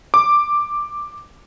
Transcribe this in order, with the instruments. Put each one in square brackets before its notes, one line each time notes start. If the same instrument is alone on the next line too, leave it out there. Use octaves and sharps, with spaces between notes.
[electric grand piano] D6